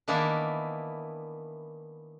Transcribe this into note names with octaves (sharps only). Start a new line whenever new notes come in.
D#3 E3 A#3 B3 D4 E4